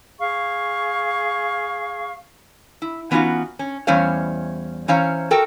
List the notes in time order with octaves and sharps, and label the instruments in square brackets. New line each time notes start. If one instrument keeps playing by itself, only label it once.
[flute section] G#4 F5 C#6
[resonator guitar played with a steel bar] E4
E3 B3 C#4 D#4 F4 F#4
C#4
E2 G3 C#4 C5 C#5 F5
E3 C#4 C5 C#5 F5 A#5
F#4 A4 A#4 G5